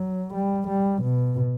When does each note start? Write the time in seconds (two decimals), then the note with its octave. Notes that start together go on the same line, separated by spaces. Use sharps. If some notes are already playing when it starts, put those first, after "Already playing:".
Already playing: F#3
0.34 G3
0.68 G3
1.03 B2